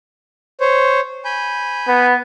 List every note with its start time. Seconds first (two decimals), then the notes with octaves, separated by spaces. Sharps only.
0.60 C5 C#5
1.25 G#5 B5 G6
1.88 B3